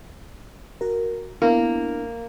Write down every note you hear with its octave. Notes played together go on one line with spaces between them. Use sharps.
F#4 A#4
A#3 B3 D4 E4